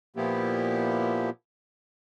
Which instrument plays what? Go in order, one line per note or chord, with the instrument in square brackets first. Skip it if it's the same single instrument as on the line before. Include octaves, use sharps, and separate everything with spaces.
[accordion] A#2 F3 A#3 B3 E4 G4